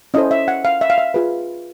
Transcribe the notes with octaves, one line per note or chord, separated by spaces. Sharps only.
C#4 E4 A4 C5 D#5
E5
F#5
F5
E5
F5
E5
F4 G#4 B4